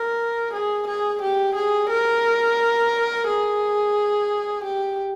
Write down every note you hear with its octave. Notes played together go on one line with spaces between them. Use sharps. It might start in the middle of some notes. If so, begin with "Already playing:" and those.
Already playing: A#4
G#4
G#4
G4
G#4
A#4
G#4
G4